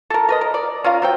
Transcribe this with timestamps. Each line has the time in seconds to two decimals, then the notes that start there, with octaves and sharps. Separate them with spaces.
0.10 A4 A#4
0.29 A#4 B4 D#5
0.41 A#4
0.54 D5
0.84 C#4 F4 A#4 F5
1.02 F#3 C4 G5